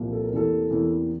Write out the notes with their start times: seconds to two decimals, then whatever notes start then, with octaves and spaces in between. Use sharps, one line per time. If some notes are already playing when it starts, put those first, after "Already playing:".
Already playing: C2 A#2 F3 A#3
0.12 A4
0.24 A#4
0.32 E2 C3 E3 A#3 A4
0.70 E2 C3 E3 A#3